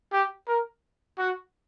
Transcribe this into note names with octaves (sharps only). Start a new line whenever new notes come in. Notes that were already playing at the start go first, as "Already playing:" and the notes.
G4
A#4
F#4